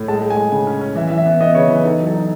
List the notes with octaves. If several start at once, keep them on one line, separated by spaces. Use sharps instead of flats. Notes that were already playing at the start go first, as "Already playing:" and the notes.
Already playing: A2
G#3 A5
G#3
G#5
G#3
C#3 G#5
C#4
C#4
E3 E5
E5
E3
E5
B3
B3 D#5
C#3 C#5
E3 B4
D#4 A4
F#3
A4
D#4